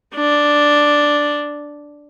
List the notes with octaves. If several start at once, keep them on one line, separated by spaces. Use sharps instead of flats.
D4